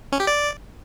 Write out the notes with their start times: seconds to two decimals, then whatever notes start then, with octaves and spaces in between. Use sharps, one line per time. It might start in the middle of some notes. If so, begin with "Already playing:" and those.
0.12 C#4
0.20 G4
0.27 D5